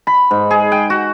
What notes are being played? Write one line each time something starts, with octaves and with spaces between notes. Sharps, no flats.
B5
G#2
G#4
G5
F#4